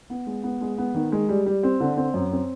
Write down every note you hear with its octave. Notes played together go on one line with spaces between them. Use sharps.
B3
G#3
B3
G#3
B3
D#3
G#3
G3
G3
C4
D3
C4
F#2
C4